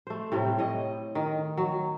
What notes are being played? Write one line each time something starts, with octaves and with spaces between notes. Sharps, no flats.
A3 C5
A2 C3 G3
A2 C#5 D#5
D#3
F#3